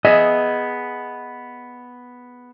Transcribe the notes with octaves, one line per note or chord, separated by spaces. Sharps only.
B3 G#4 D#5 E5